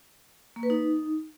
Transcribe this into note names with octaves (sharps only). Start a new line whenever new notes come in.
A#3
B4
D#4